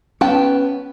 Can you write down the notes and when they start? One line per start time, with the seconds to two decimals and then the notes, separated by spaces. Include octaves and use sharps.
0.21 B3 C#4 G5 A5